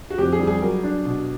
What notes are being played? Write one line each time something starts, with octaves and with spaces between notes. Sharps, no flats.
F#4
F2 G4
G#4
G3
G#4
F#3 A#4
D4
B2